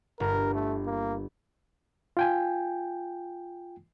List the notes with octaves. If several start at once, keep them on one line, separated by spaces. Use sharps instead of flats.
G1 A#4
A3
A#3
F4 G5 G#5